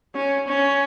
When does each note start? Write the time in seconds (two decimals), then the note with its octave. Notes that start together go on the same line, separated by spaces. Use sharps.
0.15 C#4
0.48 C#4